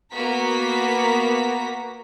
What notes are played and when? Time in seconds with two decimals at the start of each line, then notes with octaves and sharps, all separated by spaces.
0.13 A#3 B3 F#4 A#5 B6